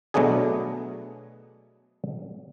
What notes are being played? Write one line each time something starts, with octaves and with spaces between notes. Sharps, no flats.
B2 F#3 A3 B3 D4 G#4